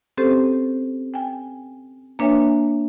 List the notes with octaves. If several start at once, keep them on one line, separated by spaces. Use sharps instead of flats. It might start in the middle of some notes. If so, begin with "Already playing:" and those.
C4 C#4 G4 A4 C5
G5 G#5
A#3 D4 B4 C#5 E5 G#5